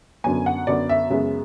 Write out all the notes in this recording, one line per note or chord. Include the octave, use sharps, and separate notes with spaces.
F#2 D3 F#3 B3 G#5
F#5
F#2 D3 F#3 B3 D5
E5
F#2 C#3 G#3 B3 E5